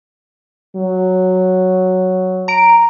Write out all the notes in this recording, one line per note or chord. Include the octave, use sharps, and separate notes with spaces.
F#3
A#5 D7